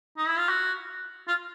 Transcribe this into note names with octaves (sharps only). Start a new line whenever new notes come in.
D#4
E4
F4
F#4
F4